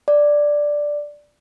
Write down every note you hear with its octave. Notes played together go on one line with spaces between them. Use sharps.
D5